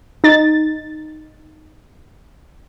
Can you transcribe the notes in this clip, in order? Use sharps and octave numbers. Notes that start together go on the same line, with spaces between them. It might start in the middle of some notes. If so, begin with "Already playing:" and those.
D#4 A6